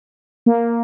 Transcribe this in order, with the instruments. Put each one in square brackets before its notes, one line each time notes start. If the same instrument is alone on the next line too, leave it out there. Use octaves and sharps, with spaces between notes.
[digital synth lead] A#3